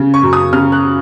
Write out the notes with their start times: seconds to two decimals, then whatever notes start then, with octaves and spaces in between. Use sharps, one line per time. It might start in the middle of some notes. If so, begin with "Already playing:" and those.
Already playing: C#3
0.14 C#6
0.23 F#2
0.33 D#6
0.53 C#3 F6
0.72 F#6